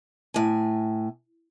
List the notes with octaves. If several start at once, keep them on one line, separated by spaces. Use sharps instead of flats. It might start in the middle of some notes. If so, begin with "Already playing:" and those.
A2 G#5